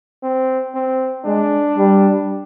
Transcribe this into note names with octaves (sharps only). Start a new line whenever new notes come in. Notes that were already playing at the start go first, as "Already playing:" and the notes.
C4
C4
G#3 D4
G3